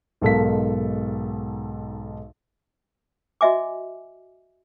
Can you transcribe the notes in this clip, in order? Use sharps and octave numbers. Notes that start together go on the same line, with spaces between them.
B1 G#2 A4 A#4 F5 B6
F#4 D#5 E5 G#5 D6